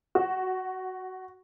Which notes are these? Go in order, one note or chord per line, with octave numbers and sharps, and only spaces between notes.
F#4